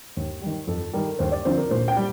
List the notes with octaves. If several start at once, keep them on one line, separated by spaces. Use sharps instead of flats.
D#2
D#3 G3
F2 A4
D#3 G3 A#4
D#2 C5
D5
D3 F3 C4 C5
A#4
A#2 C5
G5
G3